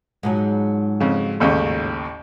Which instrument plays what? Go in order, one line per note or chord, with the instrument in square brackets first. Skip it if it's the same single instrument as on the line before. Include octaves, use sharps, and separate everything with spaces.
[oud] G#2 F3 F#3
[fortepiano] F2 C#3
A1 D#2 C#3